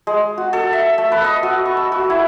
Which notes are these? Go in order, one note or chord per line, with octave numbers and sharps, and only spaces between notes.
G#3
F#4
A4
E5
A3
B4
D#5
F#4
C#6
E6
F#4
E4